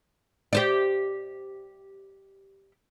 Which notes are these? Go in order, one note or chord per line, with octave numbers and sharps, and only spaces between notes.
G4 C5 D5